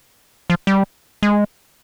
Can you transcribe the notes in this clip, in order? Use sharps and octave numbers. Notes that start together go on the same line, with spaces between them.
F3
G3
G#3